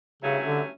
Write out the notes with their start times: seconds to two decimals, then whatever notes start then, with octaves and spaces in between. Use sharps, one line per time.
0.22 G2 C#3 F#3 A3 C#4 E4
0.45 D3